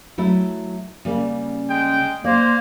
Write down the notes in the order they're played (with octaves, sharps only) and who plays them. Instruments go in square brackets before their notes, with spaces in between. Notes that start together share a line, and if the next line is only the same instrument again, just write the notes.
[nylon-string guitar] F#3 A3 E4
C#3 G3 A#3
[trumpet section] G#3 G5
[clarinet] A#3 [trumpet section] C5 [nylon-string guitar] D5